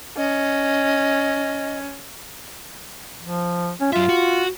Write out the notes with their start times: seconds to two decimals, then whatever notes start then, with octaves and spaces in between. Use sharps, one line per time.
0.17 C#4 D#5
3.23 F3
3.80 C#4
3.93 F#2 F4 E5
4.09 F#4